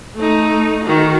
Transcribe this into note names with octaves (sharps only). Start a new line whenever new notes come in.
A3 D#4
D#3 F#4